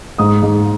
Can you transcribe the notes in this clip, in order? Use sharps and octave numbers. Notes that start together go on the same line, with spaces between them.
G#2 D#6
G#2